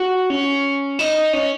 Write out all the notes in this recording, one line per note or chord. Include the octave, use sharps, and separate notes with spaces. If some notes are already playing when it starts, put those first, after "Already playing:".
Already playing: F#4
C#4
D#4
C#4